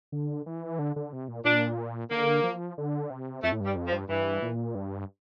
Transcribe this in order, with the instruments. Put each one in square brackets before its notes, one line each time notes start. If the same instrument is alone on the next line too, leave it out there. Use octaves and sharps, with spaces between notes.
[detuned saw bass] D3
E3
D3
D3
C3
A#2
[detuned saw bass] A#2 [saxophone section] D4
[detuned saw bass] D3 [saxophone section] A#3
[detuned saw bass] F3
D3
C3
[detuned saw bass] F2 [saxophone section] A3
[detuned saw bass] A2
[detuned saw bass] G2 [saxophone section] G3
[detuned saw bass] F2
[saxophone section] F3
[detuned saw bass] G2
[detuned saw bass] G2 [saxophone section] E3
[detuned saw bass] A#2
G2